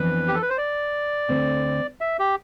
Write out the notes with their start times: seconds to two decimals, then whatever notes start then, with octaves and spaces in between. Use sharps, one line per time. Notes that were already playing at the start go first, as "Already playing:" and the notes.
Already playing: F2 E3 B3 D4 B4
0.28 G4
0.34 A4
0.42 B4
0.50 C5
0.58 D5
1.29 D2 D3 A3 C4
2.01 E5
2.19 G4